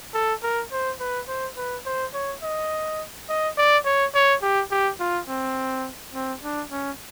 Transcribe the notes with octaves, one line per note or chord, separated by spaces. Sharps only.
A4
A#4
C5
B4
C5
B4
C5
C#5
D#5
D#5
D5
C#5
C#5
G4
G4
F4
C4
C4
D4
C#4